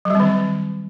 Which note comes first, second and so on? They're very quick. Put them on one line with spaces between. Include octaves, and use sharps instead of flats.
F#3 G3 C4 D#3